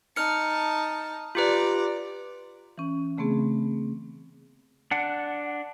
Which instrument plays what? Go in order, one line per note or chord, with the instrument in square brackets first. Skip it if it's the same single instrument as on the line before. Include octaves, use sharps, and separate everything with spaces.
[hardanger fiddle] D#4 A5 [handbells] F6 C#7
[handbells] F4 G4 B4 [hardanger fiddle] D5 A#5
[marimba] E3 C#4
C#3 A3 B3 C4 G#4
[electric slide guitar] D4 F#5